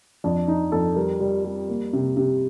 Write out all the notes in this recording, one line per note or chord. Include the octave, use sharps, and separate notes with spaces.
F2 D4
F2 D#4
F2 A4
G3 A#4
G3
G3
A#3
C3
C3